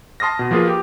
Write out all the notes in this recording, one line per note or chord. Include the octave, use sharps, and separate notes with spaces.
A5 C6 D#6 F6 A#6
B2
F3 A#3 F4 G#4 B4
G4